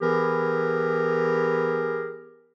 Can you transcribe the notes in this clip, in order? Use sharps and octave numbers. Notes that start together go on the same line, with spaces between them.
E3 B3 G4 G#4 A#4